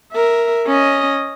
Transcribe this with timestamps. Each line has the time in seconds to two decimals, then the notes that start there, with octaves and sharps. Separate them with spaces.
0.13 A#4 E5
0.66 C#4 D#5